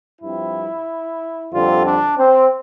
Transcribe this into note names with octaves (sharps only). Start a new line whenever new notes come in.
G2 F3 C4 E4
F2 D3 G3 C4 F4
D4
C4